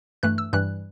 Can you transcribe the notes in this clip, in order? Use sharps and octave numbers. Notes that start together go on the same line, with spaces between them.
G2 E3 A3 F#6
E6
G2 E3 G3 F#6